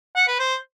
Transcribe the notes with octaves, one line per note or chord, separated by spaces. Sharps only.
F#5
B4
C5